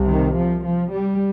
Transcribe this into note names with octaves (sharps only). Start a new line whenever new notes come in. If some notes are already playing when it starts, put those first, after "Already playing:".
Already playing: C2 C3
D#3
F3
F3
G3